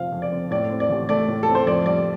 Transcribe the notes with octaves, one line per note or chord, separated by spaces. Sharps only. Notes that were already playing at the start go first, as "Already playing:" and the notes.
Already playing: F1 F3 C4 F5
F2
D5
C4
A2 D5
C4
D5
A1
A3 D5
A2
A4
C4
C5
F2 D5
G3 D5